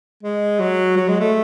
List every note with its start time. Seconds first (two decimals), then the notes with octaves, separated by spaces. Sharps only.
0.23 G#3
0.60 F#3
0.97 F#3
1.08 G#3
1.21 A3